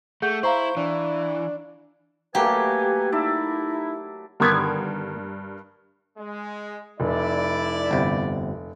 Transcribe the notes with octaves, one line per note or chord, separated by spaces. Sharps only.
A3 G#4 F#5 G6
E4 C5 F5 A#5 C#6
E3 D4
F#3 A3 A#3 G4 B4 G#5
D#4 E4 D5 E5 A5
G2 D3 D#3 B3 A#4 G#6
G#3
F1 E4 D5
G1 C3